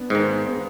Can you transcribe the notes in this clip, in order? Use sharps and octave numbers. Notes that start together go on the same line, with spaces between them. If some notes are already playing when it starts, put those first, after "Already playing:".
Already playing: B3 D4
G#2 D#3 G#3
A#3
B3
A#3